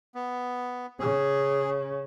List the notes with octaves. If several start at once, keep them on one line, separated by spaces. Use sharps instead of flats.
B3
C#3 G#4